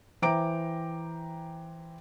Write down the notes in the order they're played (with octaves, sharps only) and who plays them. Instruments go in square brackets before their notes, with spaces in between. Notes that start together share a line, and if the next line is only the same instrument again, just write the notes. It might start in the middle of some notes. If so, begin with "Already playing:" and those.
[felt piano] E3 C5 G5 A#5 D6 D7